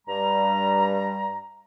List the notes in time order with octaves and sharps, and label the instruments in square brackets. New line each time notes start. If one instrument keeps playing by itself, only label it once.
[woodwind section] G2 G3 A#5